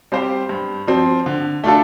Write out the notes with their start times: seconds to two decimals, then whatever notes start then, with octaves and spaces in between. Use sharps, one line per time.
0.12 G3 C4 G4 C5
0.49 G2
0.88 F3 C4
1.26 D3
1.64 A3 D4 F4 A4